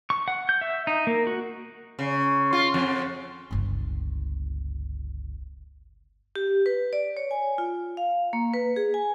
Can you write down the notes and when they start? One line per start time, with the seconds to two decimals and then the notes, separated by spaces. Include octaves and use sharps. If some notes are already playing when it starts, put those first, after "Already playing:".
0.10 C#6
0.28 F#5
0.49 G6
0.61 E5
0.87 D#4
1.07 A#3
1.27 F#4
1.99 C#3
2.53 F4
2.74 F2
3.51 G1 C#2
6.36 G4
6.66 B4
6.93 D5
7.17 C#5
7.31 G#5
7.58 F4
7.97 F5
8.33 A#3
8.54 B4
8.76 G#4
8.94 G#5